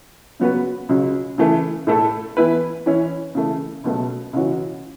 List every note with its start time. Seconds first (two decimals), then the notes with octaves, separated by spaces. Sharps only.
0.40 C#3 F#3 B3 F#4 B4
0.89 C#2 C#3 F#3
1.38 C#3 E3 A3
1.87 A2 A3 E4 A4
2.37 E3 B3 E4 B4
2.86 E3 C#4 E4
3.35 C#3 E3 A3
3.84 C#2 B2 F#3 A3
4.33 C#2 C#3 E3 C#4 F#4